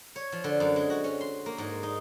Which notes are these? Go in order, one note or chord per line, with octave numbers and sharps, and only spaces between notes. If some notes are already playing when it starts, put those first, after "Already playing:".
C#5
F3
D3
F#2
G#3
F#4
C#4
C6
A#3
G#2
D#4